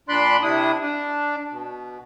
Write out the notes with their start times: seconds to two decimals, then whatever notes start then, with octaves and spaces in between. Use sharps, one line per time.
0.09 A#2 D4 D5 B5 C6 F#6
0.43 C3 D4 E4 D#6
0.81 D4
1.51 B2